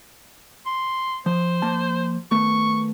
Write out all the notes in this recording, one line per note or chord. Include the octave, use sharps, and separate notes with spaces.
C6
F3 C5
F3 A#3 A5
D#3 A3 B3 C#6